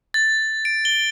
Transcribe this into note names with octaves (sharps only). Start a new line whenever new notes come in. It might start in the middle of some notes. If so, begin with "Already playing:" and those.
A6
D7
G7